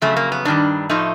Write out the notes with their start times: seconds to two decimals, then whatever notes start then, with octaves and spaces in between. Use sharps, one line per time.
0.01 F2 C#3 F#3 A3
0.17 A#3
0.32 B3
0.45 G2 D#3 G3 D4
0.89 A2 F3 A3 D#4